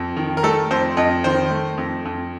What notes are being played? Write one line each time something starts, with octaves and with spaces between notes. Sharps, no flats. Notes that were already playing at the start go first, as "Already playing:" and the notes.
Already playing: F2
D#3
A#4
A3 A4
F2 C5
F2 D#5
D#3 C5
A3
F2
F2